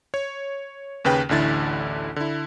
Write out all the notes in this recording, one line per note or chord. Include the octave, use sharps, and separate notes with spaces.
C#5
D#2 C#3 B4 G5
A1 D2 D3 E4 A6
D3 E4